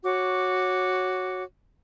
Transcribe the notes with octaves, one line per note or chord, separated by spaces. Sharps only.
F#4 C#5 D6